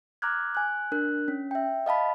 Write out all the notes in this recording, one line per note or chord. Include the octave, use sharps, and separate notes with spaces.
A#5 D6 F6 F#6 G#6
G#5 F#6
D4 A#4 F#6
C#4
E5 G5
D#5 F5 A5 B5